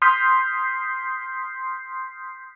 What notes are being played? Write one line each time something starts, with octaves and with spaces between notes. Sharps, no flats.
C6 D#6 F6 G6 B6 C7